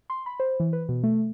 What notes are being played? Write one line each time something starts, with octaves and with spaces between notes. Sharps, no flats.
C6
B5
C5
E3
B4
B2
A3